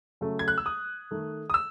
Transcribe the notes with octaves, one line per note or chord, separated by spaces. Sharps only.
C#3 F#3 A3
G#6
F#6
E6
D#6
D#3 A3
D#6
E6